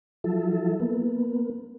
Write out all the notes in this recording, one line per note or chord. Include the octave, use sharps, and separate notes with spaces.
F3 F#3 E4 A4
A#3 B3